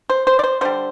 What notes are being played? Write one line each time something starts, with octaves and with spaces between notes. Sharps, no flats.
C5
C5
D5
C5
D3 G3 C5